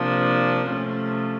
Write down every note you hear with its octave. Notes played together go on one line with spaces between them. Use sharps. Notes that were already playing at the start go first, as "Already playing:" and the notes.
Already playing: C3 F3 A#3 D4
C3 F3 A3 C#4